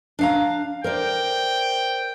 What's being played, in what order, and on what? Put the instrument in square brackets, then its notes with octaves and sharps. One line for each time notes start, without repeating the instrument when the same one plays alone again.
[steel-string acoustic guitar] D4 F5 A#5
[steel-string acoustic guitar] A#4 C5 D5 [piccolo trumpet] G5